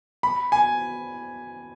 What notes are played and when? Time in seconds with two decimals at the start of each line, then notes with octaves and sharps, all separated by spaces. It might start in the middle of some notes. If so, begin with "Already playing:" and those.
0.23 B5
0.52 G#5